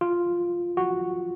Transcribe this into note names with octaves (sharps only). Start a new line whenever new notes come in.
F4
F#4